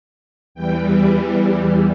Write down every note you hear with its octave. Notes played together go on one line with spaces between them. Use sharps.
E2 E3 G3 G5